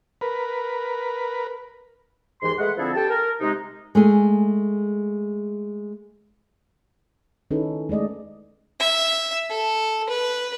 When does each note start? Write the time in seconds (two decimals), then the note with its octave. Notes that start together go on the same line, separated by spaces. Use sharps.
0.21 A#4 B4
2.42 D#2 G#2 E3 C6
2.58 G#3 A3 B4 F#5
2.77 D3 F3 C4 E4 G#4 A4
2.94 G4 A4 G5 A5
3.09 A#4
3.40 C3 G#3 D#4
3.95 G#3 A3 G#4
7.51 D#3 C#4 D#4 E4 A4 B4
7.89 G#3 A3 D5 D#5
8.80 E5
9.50 A4
10.09 B4